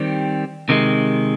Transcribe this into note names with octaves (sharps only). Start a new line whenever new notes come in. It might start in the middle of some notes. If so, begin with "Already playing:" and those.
Already playing: D#3 G3 C4 G4
C3 D#3 G#3